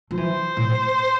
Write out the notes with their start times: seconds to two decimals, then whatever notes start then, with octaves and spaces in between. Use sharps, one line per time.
0.11 F3
0.17 E3 C5
0.57 A2